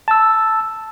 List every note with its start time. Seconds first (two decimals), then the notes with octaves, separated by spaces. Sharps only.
0.08 A5 E6